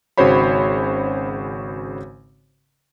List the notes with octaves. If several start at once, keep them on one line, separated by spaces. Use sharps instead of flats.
G#1 C#3 F#4 C5 C#5 B5